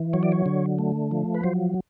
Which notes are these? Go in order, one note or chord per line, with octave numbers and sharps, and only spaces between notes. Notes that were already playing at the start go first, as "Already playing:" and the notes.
Already playing: E3
F#3 C#5
D5
C#5
D3
A3
F3
B4
F#3 C5